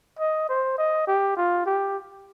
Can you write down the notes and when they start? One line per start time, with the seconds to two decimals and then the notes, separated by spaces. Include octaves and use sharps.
0.19 D#5
0.49 C5
0.78 D#5
1.07 G4
1.36 F4
1.66 G4